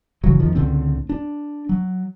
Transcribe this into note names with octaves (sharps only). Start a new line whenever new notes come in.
G1 C#3 E3 F#3
A1 E2 D#3 F3
C#2 A2 D3 C4
D4
F#3